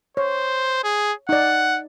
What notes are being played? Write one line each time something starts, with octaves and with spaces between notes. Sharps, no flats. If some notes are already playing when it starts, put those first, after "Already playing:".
C5 C#5
G#4
D#4 D5 F#5